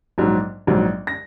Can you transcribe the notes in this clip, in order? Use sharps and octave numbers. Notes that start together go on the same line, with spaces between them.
A#1 G#2 F#3
A#1 G#2 F#3
A#6